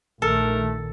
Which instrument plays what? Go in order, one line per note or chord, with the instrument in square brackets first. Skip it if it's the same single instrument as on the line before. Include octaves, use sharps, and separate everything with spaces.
[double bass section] A#1 D#3 [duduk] A3 [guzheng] A4 [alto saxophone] A#4